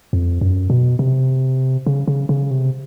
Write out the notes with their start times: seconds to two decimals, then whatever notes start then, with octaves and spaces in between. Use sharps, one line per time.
0.13 F2
0.41 F#2
0.70 B2
0.99 C3
1.86 C#3
2.07 C#3
2.29 C#3
2.51 C3